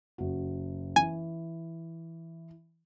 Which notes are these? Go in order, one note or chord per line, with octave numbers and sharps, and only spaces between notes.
F#1 F#4
E3 G#5